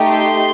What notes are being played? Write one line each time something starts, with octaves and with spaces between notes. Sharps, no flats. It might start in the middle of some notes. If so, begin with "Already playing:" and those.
Already playing: A3 D#4 G4
C6